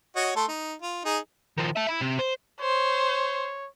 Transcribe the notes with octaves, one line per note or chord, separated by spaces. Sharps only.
F#4 C#5 D#5
A3 A4 C6
D#4
F4
D#4 G#4
D#3 F3
E5 A5
E4
C3
C5
C5 C#5